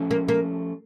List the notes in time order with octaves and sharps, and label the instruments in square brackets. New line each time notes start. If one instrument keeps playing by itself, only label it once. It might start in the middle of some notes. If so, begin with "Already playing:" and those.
Already playing: [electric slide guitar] F3 A3 C#4 G4
[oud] A#3
A#3